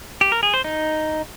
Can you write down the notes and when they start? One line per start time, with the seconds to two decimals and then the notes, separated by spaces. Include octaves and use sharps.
0.21 G4
0.32 A#4
0.43 G#4
0.54 C5
0.64 D#4